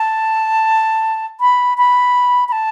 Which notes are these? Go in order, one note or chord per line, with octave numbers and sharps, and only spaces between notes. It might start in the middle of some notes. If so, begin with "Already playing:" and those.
Already playing: A5
B5
B5
B5
A5